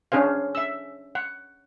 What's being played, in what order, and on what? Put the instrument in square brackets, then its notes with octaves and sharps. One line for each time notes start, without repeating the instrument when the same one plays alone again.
[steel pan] C#4 D4 G#4 C5 F5
E5 E6
F#5